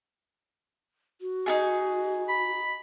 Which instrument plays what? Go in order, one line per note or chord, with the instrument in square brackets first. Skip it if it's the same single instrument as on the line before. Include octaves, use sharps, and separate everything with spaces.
[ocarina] F#4
[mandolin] D#4 E4 G#4
[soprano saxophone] B5